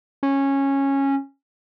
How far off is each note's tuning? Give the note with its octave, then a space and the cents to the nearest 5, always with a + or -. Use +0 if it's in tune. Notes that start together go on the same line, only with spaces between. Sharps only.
C#4 -15